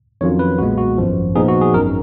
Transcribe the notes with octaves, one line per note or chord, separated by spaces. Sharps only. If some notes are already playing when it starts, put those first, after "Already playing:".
F2 D#3 F#3 C#4 F4 C#5
B4
B1 A#2 G#3 B3 F#4
F#4
G#1 F#2 F3
A#2 F3 B3 D#4 G#4
F#4
G#4
G#1 F#2 D#3 A#4